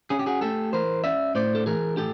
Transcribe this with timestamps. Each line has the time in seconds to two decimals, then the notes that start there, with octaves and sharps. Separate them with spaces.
0.10 C#4 G#4
0.19 G4
0.26 F#4 G#4
0.41 A3 G4 A4
0.73 E3 A#4 C5
1.04 C#4 D5 E5
1.35 A2 C5 D5
1.55 A4
1.66 E3 G#4 A#4
1.97 A2 G4 A4